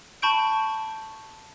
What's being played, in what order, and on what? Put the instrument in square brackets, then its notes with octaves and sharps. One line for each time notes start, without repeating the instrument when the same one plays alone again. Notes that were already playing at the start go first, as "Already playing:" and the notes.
[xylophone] A5 B5 C#6 G6 D7